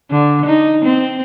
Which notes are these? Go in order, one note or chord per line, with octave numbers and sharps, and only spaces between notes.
D3
D#4
C4